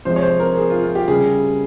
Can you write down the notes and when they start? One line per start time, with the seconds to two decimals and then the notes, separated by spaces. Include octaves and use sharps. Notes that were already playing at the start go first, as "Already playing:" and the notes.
0.05 C3 F3 G#3 C5
0.16 C#5
0.22 C5
0.40 A#4
0.57 G#4
0.70 F4
0.83 F4
0.95 G4
1.08 C#3 G3 G#4